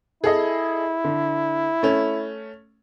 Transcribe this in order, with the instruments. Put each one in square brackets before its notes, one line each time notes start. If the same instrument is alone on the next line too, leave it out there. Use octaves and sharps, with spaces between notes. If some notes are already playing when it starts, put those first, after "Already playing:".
[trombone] E4 [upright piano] G#4 A4 D#5
[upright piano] D3
A3 C#4